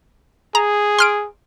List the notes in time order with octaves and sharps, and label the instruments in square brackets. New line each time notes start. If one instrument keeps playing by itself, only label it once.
[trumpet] G#4 [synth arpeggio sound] A#5
[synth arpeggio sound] C6 F6 D7